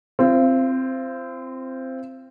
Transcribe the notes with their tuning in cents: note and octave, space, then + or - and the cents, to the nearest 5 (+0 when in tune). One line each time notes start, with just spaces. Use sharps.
C4 +0 F4 -35